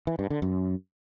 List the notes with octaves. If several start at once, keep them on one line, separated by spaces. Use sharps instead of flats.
E3
G2
D3
F#2